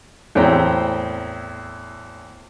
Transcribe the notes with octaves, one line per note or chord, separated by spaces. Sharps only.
E2 A2 C4 G5 A#5